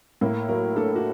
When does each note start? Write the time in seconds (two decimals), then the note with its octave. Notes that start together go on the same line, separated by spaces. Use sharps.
0.21 A2 A#3 A#4
0.49 F#3 A#3 A#4
0.76 A3 D4 A4
0.96 F#4